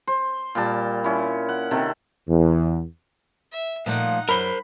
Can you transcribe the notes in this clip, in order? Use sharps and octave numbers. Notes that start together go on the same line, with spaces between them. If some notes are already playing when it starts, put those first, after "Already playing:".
C5
A#2 G3 A5
C#4 E4
F#5
C3 D#3 A4
E2
E5
A#2 F3 A3 D#4 F#5
F#2 A#4 C5 B5